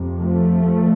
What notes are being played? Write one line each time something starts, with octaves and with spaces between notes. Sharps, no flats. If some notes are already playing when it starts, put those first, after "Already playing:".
Already playing: F2 C3
F3 A3